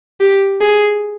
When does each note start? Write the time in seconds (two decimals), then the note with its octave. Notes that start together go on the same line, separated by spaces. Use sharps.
0.21 G4
0.61 G#4